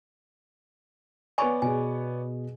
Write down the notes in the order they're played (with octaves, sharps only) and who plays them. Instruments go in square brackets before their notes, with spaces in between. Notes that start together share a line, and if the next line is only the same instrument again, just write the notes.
[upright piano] B3 C#5 D5 [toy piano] G#5 B5 C#6
[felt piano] B2 G#4 [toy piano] G#5